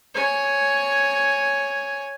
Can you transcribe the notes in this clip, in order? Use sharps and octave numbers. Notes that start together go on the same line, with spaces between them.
C#5 G#5